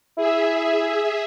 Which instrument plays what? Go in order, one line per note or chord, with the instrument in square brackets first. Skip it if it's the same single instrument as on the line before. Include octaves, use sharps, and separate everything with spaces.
[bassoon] E4 [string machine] G#4 E5